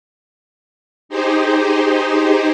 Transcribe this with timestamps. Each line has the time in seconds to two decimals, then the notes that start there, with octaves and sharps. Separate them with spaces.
1.09 D#4 G4 G#4 C5